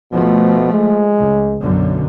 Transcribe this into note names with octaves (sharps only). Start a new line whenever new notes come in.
B2 F3 A3
G#3
C#2
B1 F#2 D3